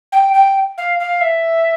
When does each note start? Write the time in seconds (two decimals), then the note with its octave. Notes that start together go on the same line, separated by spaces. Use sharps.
0.12 G5
0.34 G5
0.78 F5
0.99 F5
1.21 E5